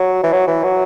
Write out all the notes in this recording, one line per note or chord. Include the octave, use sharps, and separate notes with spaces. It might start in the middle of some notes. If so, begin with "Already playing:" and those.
Already playing: F#3
E3
F#3
E3
F#3